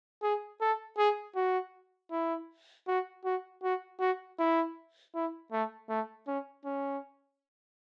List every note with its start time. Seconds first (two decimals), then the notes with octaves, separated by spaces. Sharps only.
0.23 G#4
0.61 A4
0.98 G#4
1.36 F#4
2.12 E4
2.88 F#4
3.25 F#4
3.63 F#4
4.00 F#4
4.39 E4
5.15 E4
5.52 A3
5.89 A3
6.28 C#4
6.65 C#4